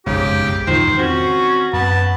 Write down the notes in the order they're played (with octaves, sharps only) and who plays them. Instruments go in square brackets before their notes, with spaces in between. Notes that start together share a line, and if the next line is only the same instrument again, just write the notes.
[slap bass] F#1 B1 F2 [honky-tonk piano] G#2 C#3 [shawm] G4
[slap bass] E2 G#2 B2 [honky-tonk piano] D#3 F3 [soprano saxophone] C5
[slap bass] C4 [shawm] C#4 [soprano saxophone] F#4 [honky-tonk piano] C#6
[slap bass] F#2 [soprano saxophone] B3 [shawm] A5